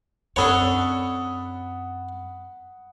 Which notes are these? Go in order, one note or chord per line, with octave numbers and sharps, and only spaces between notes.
F#2 C4 D4 A4 C#5 F#5 B5 D#6